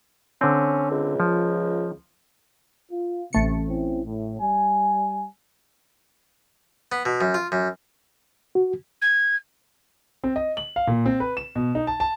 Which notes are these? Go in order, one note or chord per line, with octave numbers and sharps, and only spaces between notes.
D3 C4 C#4
C#2
F3
F4
A1 C3 A3 C#7
C4 C#4 E4
A2
G3 G#5
B3
B2
F#2
F4
F#2
F#4
G#6
C4
D#5
F#7
F5
A#2
C4
B4
E7
B2
D#4
A5
A5